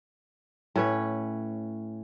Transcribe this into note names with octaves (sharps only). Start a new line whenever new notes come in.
A2 C#4 B4 C#5